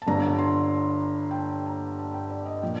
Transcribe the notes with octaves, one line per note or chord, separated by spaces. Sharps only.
A5
G1 G2 D3 A#5
C6
G5
A5
A#5
A5
G5
D5
D#5
A#2 F3 G5